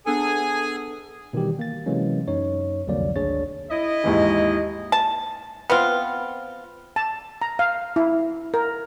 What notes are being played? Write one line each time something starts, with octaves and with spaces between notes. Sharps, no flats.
B3 D4 G#4 A4 G#5
B2 D#3 E3 G3 G4
A#3 A6
C3 E3 F#3 G#3 A#3 C#4
F#2 D#4 C#5
C2 F2 D3 F#3 A#3 D5
G#1 D2 D4 G#4 C#5 A6
E4 D#5
D#2 G#2 E3
A5
B3 C4 F4
A5
A#5
F5
E4
A#4